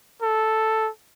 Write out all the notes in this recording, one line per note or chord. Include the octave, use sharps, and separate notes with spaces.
A4